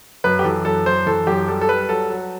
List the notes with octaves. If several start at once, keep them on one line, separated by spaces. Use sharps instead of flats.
F#2 B4
G4
E3 A4
F#2 A4
F#2 C5
E3 A4
F#2 G4
G3 A4
A4
G3 B4
F#3 A4
F#3